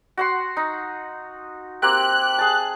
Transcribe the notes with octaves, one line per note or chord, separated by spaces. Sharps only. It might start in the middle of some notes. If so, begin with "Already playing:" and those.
F#4 F#5 C6
D#4
A#3 C4 G4 F#6
G#4 A5